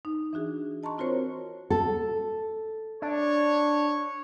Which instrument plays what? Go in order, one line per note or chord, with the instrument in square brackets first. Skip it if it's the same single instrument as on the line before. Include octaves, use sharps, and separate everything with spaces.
[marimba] D#4
E3 D4 F#4 G#4
D#5 A5 A#5 C6 C#6
C4 F4 F#4 A#4 C5 C#5
[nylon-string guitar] A4
[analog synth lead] D4 [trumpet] C#5